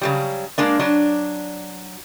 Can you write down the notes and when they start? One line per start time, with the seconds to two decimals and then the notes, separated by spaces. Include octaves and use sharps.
0.01 C#3 F#3 G3
0.58 G#3 A#3 D4
0.79 F#3 D4